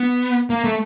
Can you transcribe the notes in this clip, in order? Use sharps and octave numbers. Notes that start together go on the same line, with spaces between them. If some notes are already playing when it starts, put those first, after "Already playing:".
Already playing: B3
A#3
A3